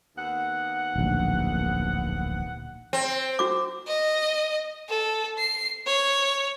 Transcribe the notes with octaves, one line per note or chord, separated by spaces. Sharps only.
D#2 B3 F#5
D1 A#1
C4
F#4 D6
D#5
A4
C7
C#5